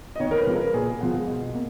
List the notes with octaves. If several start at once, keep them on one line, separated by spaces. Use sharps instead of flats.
D#5
D#2 C#5
A#4
B4
C#3 F3
A#4
A#2 G#4
F3 G#3 B3
B2
A#3